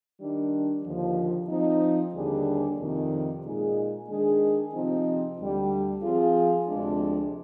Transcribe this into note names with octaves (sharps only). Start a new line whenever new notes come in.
D#3 G3 D4
D#2 D3 F3
F3 C4 D#4
D#2 D3 G3 D4 G#4
F2 C3 D#3
A#2 G#3 D#4 G#4
D#3 G#3 D4 G#4
C3 F3 C4 D#4
D2 D3 G3
F3 C4 F4 G#4
D2 C3 F3 G#3 D4